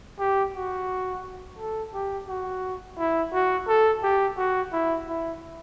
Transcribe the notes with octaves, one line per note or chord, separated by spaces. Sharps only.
G4
F#4
A4
G4
F#4
E4
F#4
A4
G4
F#4
E4
E4